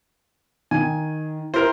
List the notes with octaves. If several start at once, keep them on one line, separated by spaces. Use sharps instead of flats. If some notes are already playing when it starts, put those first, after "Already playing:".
D#3 G#5
E4 G4 A#4 C5